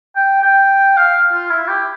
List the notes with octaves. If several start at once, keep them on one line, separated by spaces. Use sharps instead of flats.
G5
G5
F5
F4
E4
G4